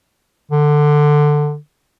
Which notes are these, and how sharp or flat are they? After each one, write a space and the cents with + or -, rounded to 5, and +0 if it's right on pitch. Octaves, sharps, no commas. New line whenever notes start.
D3 +15